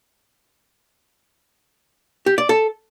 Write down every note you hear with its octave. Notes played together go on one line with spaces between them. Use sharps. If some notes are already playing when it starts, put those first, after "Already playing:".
G4
D5
A4